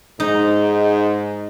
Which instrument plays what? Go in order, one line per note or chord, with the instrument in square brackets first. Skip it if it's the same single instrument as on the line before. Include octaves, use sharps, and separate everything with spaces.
[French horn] G#2 [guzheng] D#4